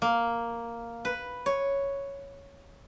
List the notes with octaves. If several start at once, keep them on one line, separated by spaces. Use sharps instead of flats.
A#3
B4
C#5